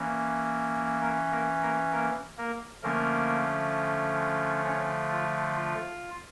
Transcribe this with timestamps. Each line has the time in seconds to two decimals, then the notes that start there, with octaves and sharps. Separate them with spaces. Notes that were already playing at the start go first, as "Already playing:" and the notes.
Already playing: E3 A#3 C#4
1.01 A#3 A#4
1.32 A#3 A#4
1.62 A#3 A#4
1.92 A#3 A#4
2.38 A#3 A#4
2.83 D3 F3 A3 A#3 C#4 A#4
4.65 C#4 C#5
5.11 F4
5.56 F4